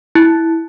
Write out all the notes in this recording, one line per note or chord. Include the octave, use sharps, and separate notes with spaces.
E4